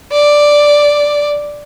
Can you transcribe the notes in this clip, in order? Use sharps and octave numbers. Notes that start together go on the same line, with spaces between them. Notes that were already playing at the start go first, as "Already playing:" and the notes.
D5